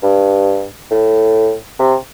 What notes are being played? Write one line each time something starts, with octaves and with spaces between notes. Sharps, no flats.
G2
A2
C3